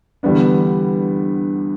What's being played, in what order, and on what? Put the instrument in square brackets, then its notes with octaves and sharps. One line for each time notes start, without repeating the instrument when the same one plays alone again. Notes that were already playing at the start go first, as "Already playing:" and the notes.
[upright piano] E2 D3 G3 B3 D4